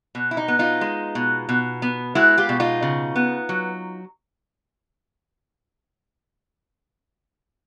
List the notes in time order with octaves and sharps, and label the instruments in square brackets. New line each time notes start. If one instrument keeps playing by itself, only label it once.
[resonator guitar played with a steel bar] B2
E4
D#4
B3
D#4 F4
G#3
B2
B2
B3
G#3 E4 F#4
F4 G4
B2
D#4 F4
C#3
B3
F#3